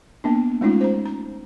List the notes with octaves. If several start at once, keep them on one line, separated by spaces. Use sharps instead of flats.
A#3 B3 D4
G#3 A3 C#4 D#4 F4
C5 A#5
A#5